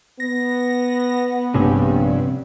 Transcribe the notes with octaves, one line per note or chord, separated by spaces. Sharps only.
B3 A#6
A#1 G2 C3 C#4